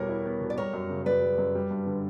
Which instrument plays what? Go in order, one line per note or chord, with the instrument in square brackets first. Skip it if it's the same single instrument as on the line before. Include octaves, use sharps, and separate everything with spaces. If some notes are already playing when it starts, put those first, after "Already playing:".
Already playing: [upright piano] E2 B2 G3 B3 [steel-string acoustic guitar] A#4 C#5
[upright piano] E4
B3
B2
[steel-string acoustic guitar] D5
[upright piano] G3 [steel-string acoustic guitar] A#4 C#5
[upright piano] F#2
C#3
[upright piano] F#2 [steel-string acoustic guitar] B4 D5
[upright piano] G3
F#2
G3
G2
D3